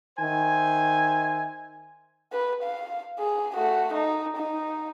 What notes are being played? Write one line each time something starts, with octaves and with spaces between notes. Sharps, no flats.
D#3 C5 E5 G#5
B4
F5
G#4
A3 F#4
D#4
D#4